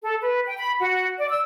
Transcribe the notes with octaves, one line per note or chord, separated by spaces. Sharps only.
A4
B4
G5
B5
F#4
D5
E6